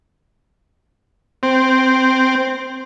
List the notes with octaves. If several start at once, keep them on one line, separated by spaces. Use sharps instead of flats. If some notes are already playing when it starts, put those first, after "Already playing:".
C4